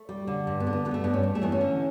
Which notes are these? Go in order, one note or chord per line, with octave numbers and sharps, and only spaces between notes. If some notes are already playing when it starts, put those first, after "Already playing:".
Already playing: A3
G3
D3
G2
B3
D3
B3
G3 B3
A3
G2 B3
C#4
G3
A3
E3 B3
C#4
D3